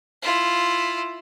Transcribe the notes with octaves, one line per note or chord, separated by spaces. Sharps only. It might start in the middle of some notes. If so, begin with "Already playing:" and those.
E4 F4